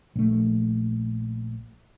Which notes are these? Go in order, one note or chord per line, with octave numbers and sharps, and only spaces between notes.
A#1 A3